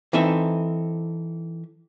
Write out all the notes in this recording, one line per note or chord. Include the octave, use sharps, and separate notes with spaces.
E3 C4 D#4 A4 E5